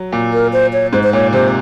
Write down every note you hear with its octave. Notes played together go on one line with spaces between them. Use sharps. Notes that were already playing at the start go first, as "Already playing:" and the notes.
Already playing: F#3
A#2
A#4
C5
C#5
G#2 C5
C5
A#2 C#5
C3 C5